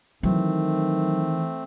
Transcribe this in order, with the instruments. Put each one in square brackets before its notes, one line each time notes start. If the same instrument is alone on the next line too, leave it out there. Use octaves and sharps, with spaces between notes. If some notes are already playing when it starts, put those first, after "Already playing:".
[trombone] D#3 [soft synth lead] E3 [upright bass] F#3 [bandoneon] A3 C4